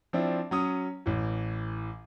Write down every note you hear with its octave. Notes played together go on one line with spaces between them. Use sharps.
F3 C4 D4 E4
F#3 C#4 D#6
A1 E3